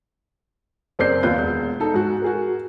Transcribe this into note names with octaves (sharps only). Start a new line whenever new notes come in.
F#1 C4 A#4 D5 G6 C7
D#2 B3 F4 B4 G6
E1
D#4 A4
G#2 F#4
F#4 G#4 A#4